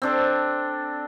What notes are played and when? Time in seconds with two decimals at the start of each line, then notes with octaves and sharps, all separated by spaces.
0.02 C4 D4 A4